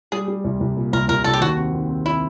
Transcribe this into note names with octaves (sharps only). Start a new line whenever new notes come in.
G3 G#4
G3
C2
C2
A#2
C2 A#4
C2 A#4
C2 A4
G4
D#2 F#4
C4
D#2
C4
C4 E4